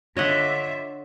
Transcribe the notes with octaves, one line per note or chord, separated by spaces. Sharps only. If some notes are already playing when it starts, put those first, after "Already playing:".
D3 F4 C#5 D#5 E5 F#5